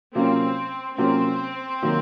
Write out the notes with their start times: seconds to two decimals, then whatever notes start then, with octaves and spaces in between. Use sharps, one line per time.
0.15 C3 F#3 A#3 C4 C#4 F4
0.98 C3 F#3 A#3 C4 C#4 F4
1.82 C3 D#3 F#3 A#3